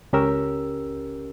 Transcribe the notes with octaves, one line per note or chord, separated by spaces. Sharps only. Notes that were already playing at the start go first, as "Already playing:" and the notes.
C#2 C#4 G4 A#4 E6